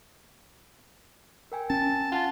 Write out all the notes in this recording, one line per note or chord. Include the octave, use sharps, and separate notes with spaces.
A#4 G5 G#5
C#4 A5
F4 F#5 A5